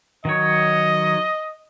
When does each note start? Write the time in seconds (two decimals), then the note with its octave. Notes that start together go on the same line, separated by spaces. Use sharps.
0.25 D#3 F#3 C#5 D#5